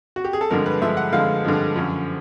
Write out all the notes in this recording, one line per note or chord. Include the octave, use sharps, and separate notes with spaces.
F#4
G4
G#4
A4
G2 D3 F3 G#3 A#4
B4
G2 D3 F3 G#3 E5
F#5
G2 D3 F3 G#3 F5
G2 D3 F3 G#3
F#2 D3 F3